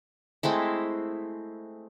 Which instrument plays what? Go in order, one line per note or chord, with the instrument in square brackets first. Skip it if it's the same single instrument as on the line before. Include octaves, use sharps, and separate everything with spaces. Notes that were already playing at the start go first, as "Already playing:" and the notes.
[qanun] G#3 A3 C4 E4